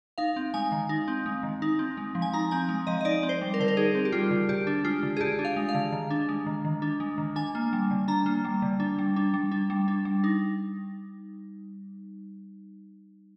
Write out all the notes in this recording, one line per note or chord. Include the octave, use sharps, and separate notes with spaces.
D#4 F5
C4
G#3 G#5
D#3
D#4
C4
G#3
D#3
D#4
C4
G#3
F3
G#5
D#4 A#5
C4 G#5
G#3
F3 D#5
D#5
D#4 D5
C4
C5
G3
A#4
D3 C5
A#4
D#4 G#4
C4
G4
G3 F4
D3
D3 G4
D4
G#3 F4
D3
G#4
D3 G4
D4
F5
G#3
F5
D3
D#3
D4
G#3
D#3
D#3
D4
G#3
D#3
D4 G#5
A#3
G3
D3
D4 A#5
A#3
G3
D3
D4
G3
D4
G3
D4
G3
D4
G3
D#4